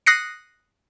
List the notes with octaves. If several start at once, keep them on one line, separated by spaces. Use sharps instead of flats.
D#6 F#6 A#6 C7 C#7